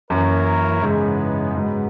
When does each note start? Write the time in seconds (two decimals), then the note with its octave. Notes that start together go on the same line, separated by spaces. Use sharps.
0.10 F#2 E3 A#3 E4 A#4 C#5
0.83 G#2 C#3 E3 G#3 B3
1.55 G#2 C#3 F#3 B3